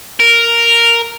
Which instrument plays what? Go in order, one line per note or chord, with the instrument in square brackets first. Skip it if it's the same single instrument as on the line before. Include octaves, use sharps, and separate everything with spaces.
[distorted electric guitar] A#4